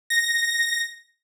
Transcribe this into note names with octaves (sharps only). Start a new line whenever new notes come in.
A#6